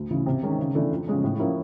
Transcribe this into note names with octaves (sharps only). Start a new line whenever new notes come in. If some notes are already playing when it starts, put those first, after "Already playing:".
Already playing: D2
C#3 E3
C3
D#3 G#3 C#4
C#3
E3 A3 D4
F2
C#3 F3 G#3 C#4
A2
F3 A#3 C#4 E4